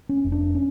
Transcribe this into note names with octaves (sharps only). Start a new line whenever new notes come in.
C#4
F1
D4
C#4